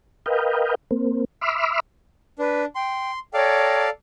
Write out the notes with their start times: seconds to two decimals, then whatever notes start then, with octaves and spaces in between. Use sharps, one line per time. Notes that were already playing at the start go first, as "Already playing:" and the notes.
0.26 A#4 B4 D#5 F5 G5
0.91 A#3 C4
1.41 E5 B5 C6 D6 E6 F6
2.39 D4 B4
2.75 G5 C6
3.34 A4 C#5 D5 F5 G5 A#5